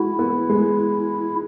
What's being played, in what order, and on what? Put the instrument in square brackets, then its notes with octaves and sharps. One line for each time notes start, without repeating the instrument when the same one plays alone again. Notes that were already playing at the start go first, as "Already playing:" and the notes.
Already playing: [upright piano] G#3 F#4 [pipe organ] E4
[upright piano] B3
G#3